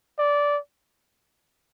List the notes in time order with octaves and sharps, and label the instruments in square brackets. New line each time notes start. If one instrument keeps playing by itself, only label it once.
[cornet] D5